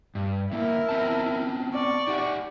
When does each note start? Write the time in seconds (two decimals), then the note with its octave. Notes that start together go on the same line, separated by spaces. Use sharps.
0.15 G2
0.52 D3 A#3 E4 A#4
0.89 B3 C4 A5
1.74 D5 C#6
2.07 D#4 G4 F#5